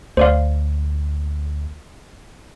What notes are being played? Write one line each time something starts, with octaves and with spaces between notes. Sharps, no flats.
D2 C5 D5 F5